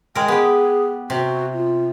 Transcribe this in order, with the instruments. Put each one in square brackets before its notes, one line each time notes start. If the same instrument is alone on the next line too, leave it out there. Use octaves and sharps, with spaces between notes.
[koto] G#3 A#4 [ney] G5
[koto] B3 G4 [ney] G#4
[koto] C3 [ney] F#4
[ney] F4